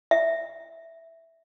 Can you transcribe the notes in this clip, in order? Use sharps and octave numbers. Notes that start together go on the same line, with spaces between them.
E5